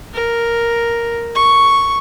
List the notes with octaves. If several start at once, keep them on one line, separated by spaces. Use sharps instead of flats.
A#4
C#6